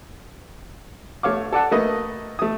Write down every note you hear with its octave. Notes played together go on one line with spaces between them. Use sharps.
A3 C#5 F5 D6
A4 D5 F#5 A5
A3 A#3 B4 D#5
A3 D#6